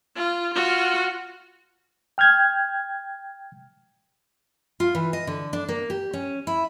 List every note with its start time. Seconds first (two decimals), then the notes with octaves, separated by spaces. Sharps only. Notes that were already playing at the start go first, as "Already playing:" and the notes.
0.16 F4
0.54 F4 F#4
2.18 G5 F6 G6 G#6
4.80 F4
4.95 E3
5.13 D#5
5.27 D3
5.53 D4
5.69 A#3
5.90 G4
6.13 C#4
6.47 E4